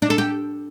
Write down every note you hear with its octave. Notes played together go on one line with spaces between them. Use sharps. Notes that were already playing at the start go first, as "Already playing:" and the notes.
D4
A4
G4